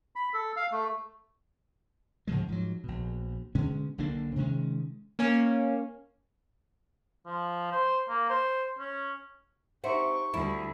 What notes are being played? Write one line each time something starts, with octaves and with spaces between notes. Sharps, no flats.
B5
A4
F5
A3
G#2 C#3 F3 G#3
G#2 F3 F#3
A#1 B2
B2 D3 G#3 C#4
B1 D3 A#3 D4
C3 D#3 G#3 C#4
A#3 C#4
F3
C5
A#3
C5
C#4
C4 D#4 G4 E5 F#5 C#6
D2 G3 E4